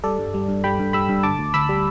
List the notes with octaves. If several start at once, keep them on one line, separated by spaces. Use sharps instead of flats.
G3 A4 D5
G2
G3
G2
G3 G5 B5
G2
G3 B5 E6
G2
D3 A5 D6
D2
D2 B5 E6
G3